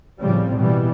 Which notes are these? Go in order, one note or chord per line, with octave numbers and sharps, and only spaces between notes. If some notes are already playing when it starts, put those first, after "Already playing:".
A2 C#3 F3 G3 C4
B2 E3 G3